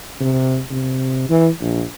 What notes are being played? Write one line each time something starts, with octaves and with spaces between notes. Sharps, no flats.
C3
C3
E3
A#1